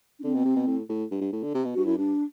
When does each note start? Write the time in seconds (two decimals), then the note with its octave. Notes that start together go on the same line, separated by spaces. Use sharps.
0.19 D4
0.24 D3 C4
0.35 B2
0.45 C3
0.56 B2
0.67 A2
0.89 A2
1.11 G2
1.22 G2
1.33 A2
1.43 D3
1.55 C3
1.65 B2
1.74 G2 F#4
1.86 F#2 E4
1.98 G2 D4